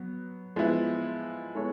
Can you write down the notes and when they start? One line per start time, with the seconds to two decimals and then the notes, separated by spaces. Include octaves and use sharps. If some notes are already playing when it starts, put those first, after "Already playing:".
Already playing: F#3 B3
0.56 F3 G#3 B3 E4
1.55 G#3 B3 E4 A4 C#5